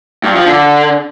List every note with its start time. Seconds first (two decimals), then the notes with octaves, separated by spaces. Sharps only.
0.24 G2
0.35 F3
0.46 D3